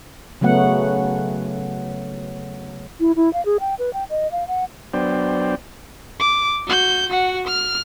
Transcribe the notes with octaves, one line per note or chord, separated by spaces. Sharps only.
C#3 F#3 A3 B3 F#5
E4
E4
F5
G#4
G5
B4
G5
D#5
F5
F#5
F#3 B3 D4 C5 D5 G5
D6
F#4 G6
F#4 F#5
F6